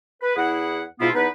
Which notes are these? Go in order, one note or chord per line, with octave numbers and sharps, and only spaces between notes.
B4
E2 E4 G#4 F#5
G#2 B2 B3 E4 F4
E2 B3 D#4 B4